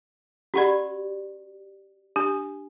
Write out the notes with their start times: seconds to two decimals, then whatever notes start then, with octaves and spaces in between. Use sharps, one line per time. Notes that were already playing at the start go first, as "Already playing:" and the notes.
0.54 C#4 F#4 G4 D5 F#5 B5
2.16 D4 G4